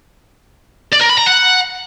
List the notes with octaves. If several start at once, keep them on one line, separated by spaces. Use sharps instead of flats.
D5
A#4
B5
A#5
F#5